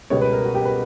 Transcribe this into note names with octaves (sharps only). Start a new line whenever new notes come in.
C#2 B2 G3 B3 C#5
B4
A#4
F#4
G4
B4